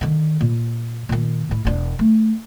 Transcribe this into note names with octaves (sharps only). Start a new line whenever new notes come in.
D3 D#3
A#2
A#2 D#3
A2 E4
E1 D4
A3